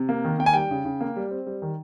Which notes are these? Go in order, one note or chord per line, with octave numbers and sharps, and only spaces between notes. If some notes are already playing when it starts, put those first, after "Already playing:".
Already playing: C3
A#3
D#3
A#3 G5
G#5
G3 G5
C#3
C#3
A#3
G3
C4
G3
D#3